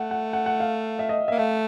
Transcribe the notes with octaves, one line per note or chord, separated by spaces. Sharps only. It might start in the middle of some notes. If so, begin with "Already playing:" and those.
Already playing: A3 F#5
F#5
F#5
F#5
F5
E5
D#5
A#3 E5
A3 F5